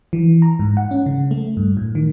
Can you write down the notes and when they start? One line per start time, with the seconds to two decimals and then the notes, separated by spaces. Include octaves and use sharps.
0.13 E3
0.42 A#5
0.59 G#2
0.77 F#5
0.91 C#4
1.06 C#3
1.31 A3
1.57 G2
1.77 A2
1.95 D#3